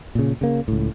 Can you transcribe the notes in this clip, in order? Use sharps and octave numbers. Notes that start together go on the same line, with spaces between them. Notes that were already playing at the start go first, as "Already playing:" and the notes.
A#2 C#3
C#3 A#3
C#2 A2